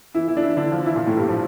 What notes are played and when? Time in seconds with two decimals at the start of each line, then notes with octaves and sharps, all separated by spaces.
0.14 E3 E4
0.28 E3 E4
0.37 D4
0.42 E3 E4
0.57 D3 D4
0.72 F3 F4
0.85 E3 E4
0.96 A#2 A#3
1.07 A2 A3
1.18 G2 G3
1.29 F3